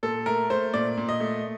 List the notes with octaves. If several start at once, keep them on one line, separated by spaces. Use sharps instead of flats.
A#2 A4
A3 A#4
A3 C5
A#2 D5
A#2
D#5
A3